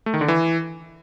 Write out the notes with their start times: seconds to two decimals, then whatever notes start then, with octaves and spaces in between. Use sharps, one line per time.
0.06 A3
0.14 D#3
0.21 D3
0.28 E3